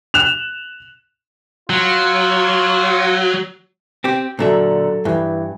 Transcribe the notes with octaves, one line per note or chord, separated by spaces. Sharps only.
F#6 E7 F7
F#3 F4
C4 G4
A#2 D3 F#3 A4 E5
G2 E3